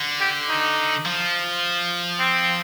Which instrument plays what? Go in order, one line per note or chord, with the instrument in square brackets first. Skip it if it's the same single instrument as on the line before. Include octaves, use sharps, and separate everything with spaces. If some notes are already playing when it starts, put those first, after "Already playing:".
Already playing: [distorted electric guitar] D3
[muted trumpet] G4
D#4
[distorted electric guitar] F3
[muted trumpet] C4